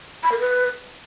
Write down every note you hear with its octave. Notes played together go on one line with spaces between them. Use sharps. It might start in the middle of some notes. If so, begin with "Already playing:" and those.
B5
A#4
B4